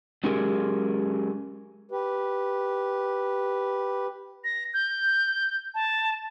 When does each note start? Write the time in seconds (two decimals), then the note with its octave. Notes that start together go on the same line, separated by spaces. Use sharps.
0.24 F#3 G#3 C#4 G4 G#4 A#4
1.91 G4 B4
4.44 A#6
4.74 G6
5.75 A5